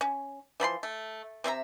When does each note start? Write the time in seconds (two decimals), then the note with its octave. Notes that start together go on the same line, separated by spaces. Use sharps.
0.01 C#4
0.60 E3 F3 B5 C6
0.83 A3
1.44 C3 C4 E5 A#5